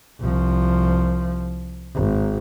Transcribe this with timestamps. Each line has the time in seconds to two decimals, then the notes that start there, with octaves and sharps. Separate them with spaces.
0.21 C2 F3
1.95 G#1